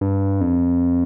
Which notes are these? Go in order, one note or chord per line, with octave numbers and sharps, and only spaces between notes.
G2
F2